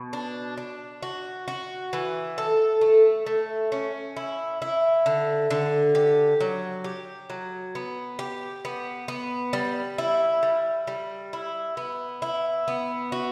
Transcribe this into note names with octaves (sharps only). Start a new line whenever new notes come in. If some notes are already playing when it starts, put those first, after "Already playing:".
Already playing: B2
D4
D4
F#4
F#4
E3
A4
A3
A3
C#4
E4
E4
D3
D3
G4
F#3
G4
F#3
B3
G4
B3
B3
G3
E4
G3
G3
E4
B3
E4
B3
F#4